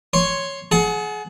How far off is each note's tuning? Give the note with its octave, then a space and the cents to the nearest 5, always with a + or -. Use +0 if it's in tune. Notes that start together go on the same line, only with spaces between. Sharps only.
C#5 +0 C6 +10
G#4 +30 F#5 +0 A5 -25